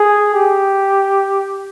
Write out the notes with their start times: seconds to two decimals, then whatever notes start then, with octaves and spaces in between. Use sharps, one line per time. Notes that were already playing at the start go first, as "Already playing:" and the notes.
Already playing: G#4
0.34 G4